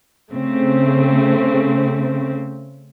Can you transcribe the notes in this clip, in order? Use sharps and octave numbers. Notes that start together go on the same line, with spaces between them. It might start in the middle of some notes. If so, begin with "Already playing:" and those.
C#3 A3 C4